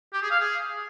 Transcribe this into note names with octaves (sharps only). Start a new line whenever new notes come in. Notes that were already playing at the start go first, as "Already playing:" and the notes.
G4
G#4
F5
G#4